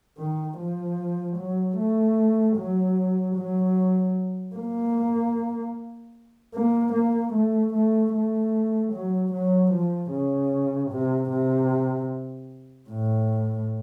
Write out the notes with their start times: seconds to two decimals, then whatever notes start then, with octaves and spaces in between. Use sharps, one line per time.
0.18 D#3
0.58 F3
1.37 F#3
1.77 A3
2.57 F#3
3.36 F#3
4.56 A#3
6.54 A#3
6.93 A#3
7.34 A3
7.74 A3
8.13 A3
8.93 F#3
9.33 F#3
9.72 F3
10.11 C#3
10.92 C3
11.30 C3
12.89 A2